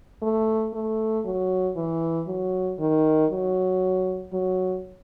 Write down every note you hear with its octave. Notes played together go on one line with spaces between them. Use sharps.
A3
A3
F#3
E3
F#3
D#3
F#3
F#3